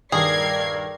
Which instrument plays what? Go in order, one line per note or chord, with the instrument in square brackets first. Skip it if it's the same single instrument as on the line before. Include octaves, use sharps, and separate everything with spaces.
[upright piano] D#1 G2 D#3 [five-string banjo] G#4 [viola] A#4 D5 [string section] G#6 C7